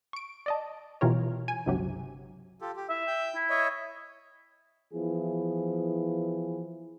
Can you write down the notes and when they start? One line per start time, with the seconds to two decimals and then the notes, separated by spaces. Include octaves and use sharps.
0.13 C#6 D7
0.46 D5 D#5 A5
1.01 B2 E3 G3 F4 A#4 C#5
1.48 G#5
1.66 G1 C#2 C3 F#3 G4
2.61 F4 G4 A4
2.76 G4
2.89 E4 E5
3.07 G5 G6
3.35 E4
3.50 C#5 D#5 E5
4.93 E3 F3 B3 E4 G#4